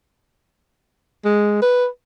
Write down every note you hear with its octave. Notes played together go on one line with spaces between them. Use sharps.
G#3
B4